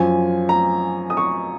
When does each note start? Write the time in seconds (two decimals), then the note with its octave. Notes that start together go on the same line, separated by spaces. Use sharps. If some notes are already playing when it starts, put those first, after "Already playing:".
Already playing: F#2 F3 G#5
0.49 A#5
1.10 D#6
1.17 C#6